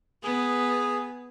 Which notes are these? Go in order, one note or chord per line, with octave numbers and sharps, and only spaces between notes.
B3 G#4